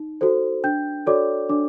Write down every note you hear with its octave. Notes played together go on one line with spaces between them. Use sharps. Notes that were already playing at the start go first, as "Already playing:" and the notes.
Already playing: D#4
F#4 A4 C5
D4 G5 G6
F#4 A4 C#5 D5 D6
D4 D5 D6